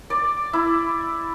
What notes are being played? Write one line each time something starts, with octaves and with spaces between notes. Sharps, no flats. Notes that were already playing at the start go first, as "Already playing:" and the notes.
D5
E4